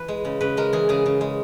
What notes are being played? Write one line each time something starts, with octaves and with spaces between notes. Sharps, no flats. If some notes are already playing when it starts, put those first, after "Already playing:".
Already playing: E3 B4
G#3
C#3
C#3 B4
G#3 A#4
E3 G#4
C#3 G#4
C#3
G#3